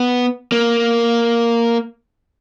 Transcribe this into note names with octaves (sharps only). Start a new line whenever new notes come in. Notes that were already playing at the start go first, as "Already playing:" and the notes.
Already playing: B3
A#3